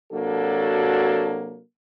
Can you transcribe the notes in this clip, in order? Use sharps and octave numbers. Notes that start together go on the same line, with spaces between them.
C3 F#3 A#3 D4 F#4 A4